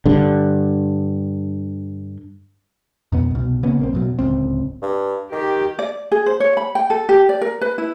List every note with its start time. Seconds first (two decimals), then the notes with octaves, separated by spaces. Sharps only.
0.06 G2 D3
3.12 F2 B2 B3
3.31 C2 B2
3.63 C#3 A#3 B3 C#4
3.79 A#1 A#3 C4
3.93 F#2 B2 F#3
4.19 D1 C#2 C4
4.83 G2
5.32 D#3 G4
5.79 D5
6.12 G#4
6.26 C5
6.40 C#5
6.57 B5
6.75 G5
6.90 A4
7.09 G4
7.29 D5
7.41 A#4
7.61 B4
7.78 E4